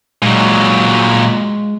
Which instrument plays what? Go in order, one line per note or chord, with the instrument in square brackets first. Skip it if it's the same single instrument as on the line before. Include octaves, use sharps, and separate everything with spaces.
[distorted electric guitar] A#2 F#3 [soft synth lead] G#3